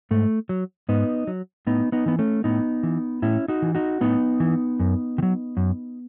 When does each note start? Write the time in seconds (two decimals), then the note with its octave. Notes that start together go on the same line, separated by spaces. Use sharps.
0.11 G#2 A3
0.49 F#3
0.89 G#2 B3 D#4
1.27 F#3
1.67 A2 B3 D#4
1.92 B3 D#4
2.06 E3 B3
2.19 A3 C#4
2.44 A2 B3 D#4
2.83 E3
3.22 A2 C#4 E4
3.48 D#4 F#4
3.62 E3
3.75 D#4 F#4
4.01 A2 B3 D#4
4.40 E3
4.80 F#2
5.18 D#3
5.22 F#3
5.57 F#2